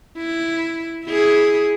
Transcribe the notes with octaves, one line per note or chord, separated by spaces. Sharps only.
E4
E4 G#4